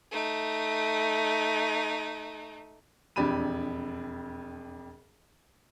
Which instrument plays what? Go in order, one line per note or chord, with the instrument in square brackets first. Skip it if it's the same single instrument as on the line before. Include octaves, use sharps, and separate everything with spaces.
[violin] A3 D#4
[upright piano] E1 F2 D4 G4 B5 D#7